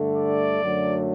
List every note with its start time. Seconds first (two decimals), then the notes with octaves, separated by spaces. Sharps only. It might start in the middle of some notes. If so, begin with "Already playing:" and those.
Already playing: G2 D3 A3
0.16 D5
0.62 F#2 D3 F#3 A3